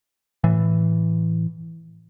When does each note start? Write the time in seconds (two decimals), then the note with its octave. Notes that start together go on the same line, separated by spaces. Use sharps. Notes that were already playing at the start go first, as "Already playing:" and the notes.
0.44 A2 E3